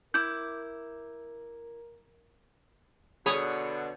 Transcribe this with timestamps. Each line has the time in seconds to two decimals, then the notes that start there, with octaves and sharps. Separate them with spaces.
0.14 E4 A#4 D6 G6
3.26 B2 D3 G#4 C#5 B5 D#6